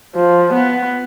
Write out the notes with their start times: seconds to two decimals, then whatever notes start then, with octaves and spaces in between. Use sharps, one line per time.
0.15 F3
0.53 B3